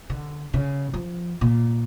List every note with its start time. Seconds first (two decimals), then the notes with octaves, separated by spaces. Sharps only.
0.10 D3
0.54 C#3
0.93 F3
1.41 A#2